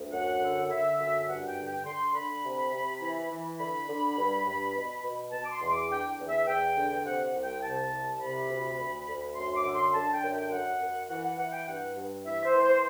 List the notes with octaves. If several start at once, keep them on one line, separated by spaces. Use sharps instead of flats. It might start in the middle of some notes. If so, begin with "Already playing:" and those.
Already playing: D2
F#2 F#5
D3
D3 E5
F#2
G2 F#5
G5
D3
G5
D3 C6
D3 B5
C3
C3
E3
E3
D3 B5
D3
G2
G2
B2
B2
B2 A5
D6
C6
E2
D6
D3 G5
E2
E5
E2 G5
D3
C3 F#5
C2
G5
C3 A5
C2
C3 B5
D2
D2
D2
F#2 C6
D6
D3
C6
D3 A5
G5
F#2
G5
F#2 F#5
F#2
E3 F#5
F#5
E3 F#5
G5
G2 F#5
G2
E3 E5
C5
E3
C5